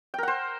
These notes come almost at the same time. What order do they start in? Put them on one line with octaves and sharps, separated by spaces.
G5 A#4 F#5 C5